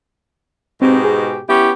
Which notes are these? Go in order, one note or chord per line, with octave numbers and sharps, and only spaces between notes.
G#2 B2 C4 G4
G#4
B3 C#4 E4 G4